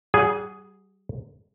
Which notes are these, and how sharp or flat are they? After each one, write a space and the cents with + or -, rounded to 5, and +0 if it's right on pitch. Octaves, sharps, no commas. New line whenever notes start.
G3 -35 G#4 +0 F#5 +0